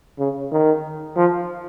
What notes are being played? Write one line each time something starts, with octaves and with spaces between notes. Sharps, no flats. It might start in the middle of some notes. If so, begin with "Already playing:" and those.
C#3
D#3
F3